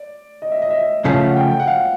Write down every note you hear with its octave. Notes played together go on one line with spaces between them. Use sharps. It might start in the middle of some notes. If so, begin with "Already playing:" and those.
Already playing: D5
D#5
E5
D#5
E5
D#5
C#3 F3 A3 C#4 F5
F#5
G5
G5
F#5
F5